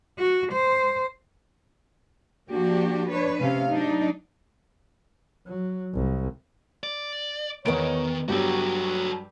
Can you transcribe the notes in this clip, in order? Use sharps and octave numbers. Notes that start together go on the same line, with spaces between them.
F#4
C5
F3 A#3 D4 F#4 G4
D4 B4 C#5
C3 A3 C#4 F5
F#3 D4 D#4
F#3
C2
D5
E2 D#3 B3 A#4 B4 C#5 D#5 D7
G2 F#3 F#4 G4 A4 G5